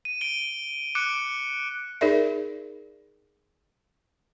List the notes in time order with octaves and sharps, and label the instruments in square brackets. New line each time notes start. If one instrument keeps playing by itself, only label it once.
[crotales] D#7
D7 D#7 G7
D6 F#6 C#7 D7
[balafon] D#4 G#4 A#4 D5 E5